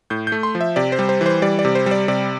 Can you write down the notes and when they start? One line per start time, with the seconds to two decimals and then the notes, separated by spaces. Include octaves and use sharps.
0.10 A2 G6
0.27 A3 G6
0.43 C6
0.55 F3
0.61 E5
0.76 C3 D5
0.92 C5
0.99 G3
1.09 C5
1.21 E3
1.26 C5
1.42 G3 D5
1.59 D5
1.65 C3
1.75 C5
1.86 G3
1.91 D5
2.08 C3 D5